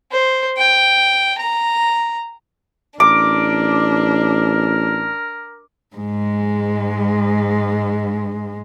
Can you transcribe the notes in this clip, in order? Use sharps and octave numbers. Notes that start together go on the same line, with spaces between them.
C5
G5
A#5
A1 D4 A#4 D6
G#2 G#3